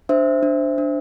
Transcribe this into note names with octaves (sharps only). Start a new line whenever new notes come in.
D4 C5 E5
D4
D4